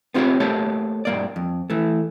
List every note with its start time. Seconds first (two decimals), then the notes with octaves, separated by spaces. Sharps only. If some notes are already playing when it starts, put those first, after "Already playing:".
0.14 B3 C4 F4 G4 A#4 C#5
0.40 A3 A#3 G4 A4 C5 C#5
1.05 G2 A#3 D5
1.36 F2
1.70 E3 A3